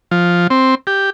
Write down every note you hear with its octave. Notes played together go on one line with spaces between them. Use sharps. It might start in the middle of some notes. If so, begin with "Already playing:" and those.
F3
C4
G4